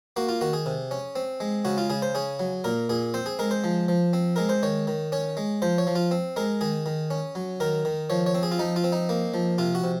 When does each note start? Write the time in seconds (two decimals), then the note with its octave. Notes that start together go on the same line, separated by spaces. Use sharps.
0.16 A#3 F#4
0.29 F4
0.41 D#3 F#4
0.53 G#4
0.66 C3
0.91 C#4
1.16 C4
1.40 G#3
1.65 C#3 F#4
1.78 F4
1.90 C#3 G#4
2.02 C5
2.15 C#4 G#4
2.40 F#3
2.64 A#2 A#4
2.89 A#2 G#4
3.14 C4 C5
3.26 G#4
3.39 G#3 A#4
3.51 C5
3.64 F3
3.88 F3
4.13 C4
4.36 G#3 A#4
4.49 C5
4.63 D#3 C#5
4.87 D#3
5.12 C#4 C#5
5.37 G#3
5.62 F3 C5
5.78 C#5
5.87 F3
5.96 F4
6.11 C4
6.36 G#3 A#4
6.61 D#3 G#4
6.86 D#3
7.11 C#4
7.35 F#3
7.60 D#3 A#4
7.85 D#3
8.10 F3 C#5
8.26 C#5
8.35 C4
8.43 G#4
8.52 F4
8.59 F3 D#4
8.76 F4
8.84 C4
8.92 D#4
9.09 A#3
9.34 F3
9.58 C3 F4
9.75 F#4
9.84 C3